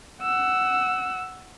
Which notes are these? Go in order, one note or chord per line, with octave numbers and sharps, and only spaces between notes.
F#5 E6